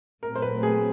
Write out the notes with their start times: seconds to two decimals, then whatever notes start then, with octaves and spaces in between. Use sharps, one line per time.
0.22 A#2 F#3 A3 C4 A#4
0.35 C5
0.42 B4
0.63 G#4